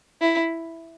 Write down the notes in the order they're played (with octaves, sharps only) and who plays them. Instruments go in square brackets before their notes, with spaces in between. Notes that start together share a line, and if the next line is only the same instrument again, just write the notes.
[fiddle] E4